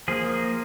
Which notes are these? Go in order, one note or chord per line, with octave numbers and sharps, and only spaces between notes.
F3 A#3 G#4